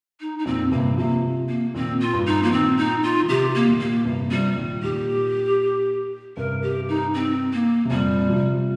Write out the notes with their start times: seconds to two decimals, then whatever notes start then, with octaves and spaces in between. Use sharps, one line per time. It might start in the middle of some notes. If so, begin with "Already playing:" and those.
0.20 D#4
0.38 D#4
0.46 F2 A#2 C4
0.71 G2 C3 A#3
0.97 C3 F3 A#3
1.49 A#3
1.74 A#2 D#3 C4
2.00 F4
2.13 G2
2.26 D#4
2.43 F3 A#3
2.51 A#2 D#3 C4
2.77 D#4
3.03 F4
3.22 D#3
3.28 C3 F3 G4
3.54 A#3
3.67 A#2 D#3
3.79 A#3
4.05 G2 C3
4.31 C3 F3 G3
4.56 A#2 D#3
4.82 A#2 D#3 G4
6.37 G2 C3 A#4
6.62 G4
6.88 D#4
7.14 C4
7.53 A#3
7.85 C3
7.90 F2 A#2 G3
8.29 C3 F3